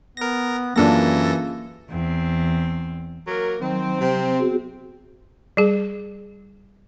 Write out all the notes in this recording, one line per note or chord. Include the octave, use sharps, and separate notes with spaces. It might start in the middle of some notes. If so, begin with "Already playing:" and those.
B3 A#4 A#6
F#2 C#3 E3 A#3 D4 F4 A4 A#6
E2 C4
F#3 A#3 A#4
D#3 F#3 C4
C3
B3 F#4 G#4
G3 G#4